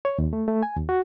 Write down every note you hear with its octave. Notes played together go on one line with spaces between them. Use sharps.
C#5
D#2
A3
A3
G#5
D#2
F#4